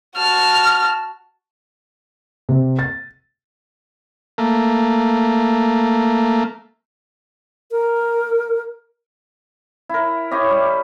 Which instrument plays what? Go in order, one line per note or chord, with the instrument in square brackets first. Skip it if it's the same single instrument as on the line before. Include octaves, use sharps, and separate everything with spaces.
[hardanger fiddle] F#4 A5 [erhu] F6
[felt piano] C3
A6
[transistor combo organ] A3 A#3
[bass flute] A#4
[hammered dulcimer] E4 A#4
E4 G4 C#5 D#5
G3